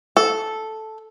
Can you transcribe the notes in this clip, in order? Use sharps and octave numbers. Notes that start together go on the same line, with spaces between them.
A4